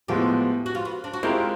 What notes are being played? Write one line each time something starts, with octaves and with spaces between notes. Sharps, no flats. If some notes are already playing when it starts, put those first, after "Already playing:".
A2 F3 G#3 B3 G4
F#4
F4
B3
D4
F#4
G#3 C4 E4 F4 G4 A#4